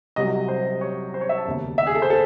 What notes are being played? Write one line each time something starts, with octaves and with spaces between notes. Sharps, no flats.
C2 C3 F#3 D#5
C5
C#5
C5
C#5
E5
A5
E1 D#2 C#3
E5
G#4
A4
C5
A4